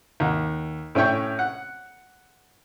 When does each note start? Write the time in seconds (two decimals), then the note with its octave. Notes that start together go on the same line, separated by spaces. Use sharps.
0.20 D#2 F#5
0.95 A2 C#4 E5 G5 C#6
1.39 F#5